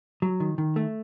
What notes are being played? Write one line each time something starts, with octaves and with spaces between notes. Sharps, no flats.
F#3
D#3
D#3
A3